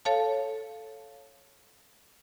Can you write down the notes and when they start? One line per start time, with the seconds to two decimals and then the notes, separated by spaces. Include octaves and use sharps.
0.05 A4 C#5 F5 A5